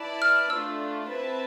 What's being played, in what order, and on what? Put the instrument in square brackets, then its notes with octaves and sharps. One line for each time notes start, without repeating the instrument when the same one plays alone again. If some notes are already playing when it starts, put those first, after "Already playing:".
Already playing: [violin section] E4 B4 D5 A5
[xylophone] F6
[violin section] A3 D4 F4 [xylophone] E6
[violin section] C4 E4 B4 E5 A5